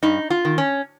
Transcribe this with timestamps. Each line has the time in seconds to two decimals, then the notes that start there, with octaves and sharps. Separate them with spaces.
0.03 G2 D#4
0.30 F4
0.45 D#3
0.58 C#4